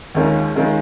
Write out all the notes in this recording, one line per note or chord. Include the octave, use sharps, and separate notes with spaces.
D#2 D#3 G#3 C#4 F4
D#3 G#3 C#4 F4